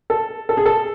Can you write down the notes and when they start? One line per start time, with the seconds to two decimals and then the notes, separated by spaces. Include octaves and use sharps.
0.10 A4
0.49 A4
0.57 G#4
0.66 A4